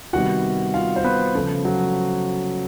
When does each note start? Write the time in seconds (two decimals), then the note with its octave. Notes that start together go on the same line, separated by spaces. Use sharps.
0.13 C3 D#3 G3 B3 F#4 F#5
0.74 F4 F5
0.96 C5
1.04 B3 B4
1.35 C#3 F3 A3
1.65 F#3 F#4